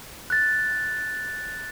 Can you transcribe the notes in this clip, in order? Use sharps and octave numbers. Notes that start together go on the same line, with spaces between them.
F#6 A6